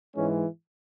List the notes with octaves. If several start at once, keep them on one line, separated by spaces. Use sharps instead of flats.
G#2 E3 G#3 C#4